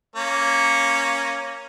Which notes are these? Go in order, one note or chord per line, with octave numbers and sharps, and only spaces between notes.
A#3 C#4